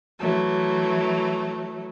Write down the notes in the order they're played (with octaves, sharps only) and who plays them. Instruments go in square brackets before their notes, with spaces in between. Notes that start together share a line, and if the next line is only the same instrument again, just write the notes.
[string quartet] E3 F#3 A3